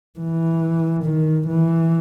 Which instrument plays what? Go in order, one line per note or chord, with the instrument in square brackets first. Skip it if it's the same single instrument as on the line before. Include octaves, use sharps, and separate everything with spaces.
[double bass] E3
D#3
E3